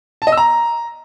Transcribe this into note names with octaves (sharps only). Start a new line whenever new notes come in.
A5
D#5
E6
A#5